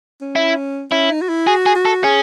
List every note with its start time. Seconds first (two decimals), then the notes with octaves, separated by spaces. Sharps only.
0.21 C#4
0.36 E4
0.91 C#4 E4
1.10 D#4
1.22 F#4
1.29 E4
1.47 F#4 G#4
1.66 G#4
1.76 F#4
1.85 A4
2.04 C#4 G#4